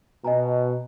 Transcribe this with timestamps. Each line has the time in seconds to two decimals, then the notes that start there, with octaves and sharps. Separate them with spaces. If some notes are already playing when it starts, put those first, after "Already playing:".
0.24 B2 D#5 G#5 A#5